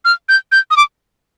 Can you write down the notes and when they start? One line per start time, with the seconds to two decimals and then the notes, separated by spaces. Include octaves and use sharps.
0.05 F6
0.29 G6
0.52 G6
0.71 D#6
0.77 D6